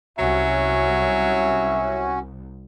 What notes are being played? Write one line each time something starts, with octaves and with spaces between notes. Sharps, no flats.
C2 F#3 C#4 F#4 E5